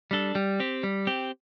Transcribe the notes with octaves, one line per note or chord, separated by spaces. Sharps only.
G3 D4 A4
G3
C4 G4
G3
C4 G4